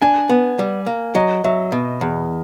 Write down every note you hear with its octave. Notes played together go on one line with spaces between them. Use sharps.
D4 G#5
B3
G3
A#3
F#3 D#5
F#3 E5
B2
E2